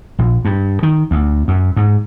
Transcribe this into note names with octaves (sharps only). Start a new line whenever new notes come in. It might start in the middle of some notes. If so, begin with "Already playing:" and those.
A#1
G2
D#3
D2
F#2
G#2